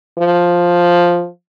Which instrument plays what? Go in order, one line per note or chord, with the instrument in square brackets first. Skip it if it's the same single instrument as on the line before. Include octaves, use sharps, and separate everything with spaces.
[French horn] F3